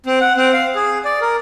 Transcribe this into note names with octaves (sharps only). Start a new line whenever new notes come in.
C4
F#5
C4
F5
G#4
D5
A#4